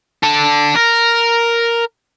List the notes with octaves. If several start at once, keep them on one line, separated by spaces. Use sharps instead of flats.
D4 A4
A#4